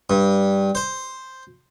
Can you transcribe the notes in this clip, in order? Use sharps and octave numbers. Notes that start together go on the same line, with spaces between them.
G2
C5